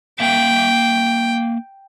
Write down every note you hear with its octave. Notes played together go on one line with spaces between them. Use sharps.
A#3 E5 F5 G5